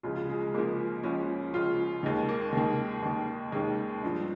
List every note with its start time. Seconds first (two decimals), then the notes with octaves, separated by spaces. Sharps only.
0.03 C#2 C#3 F3 F4
0.16 F4
0.29 G#3
0.41 G#3
0.54 C#2 C#3 F3 A#3
1.03 C#2 C#3 F3 C#4
1.53 C#2 C#3 F3 F4
2.03 D#2 D#3 G#3
2.29 A#3
2.53 D#2 D#3 G#3
3.03 D#2 D#3
3.52 D#2 D#3 G#3
4.03 G2 F3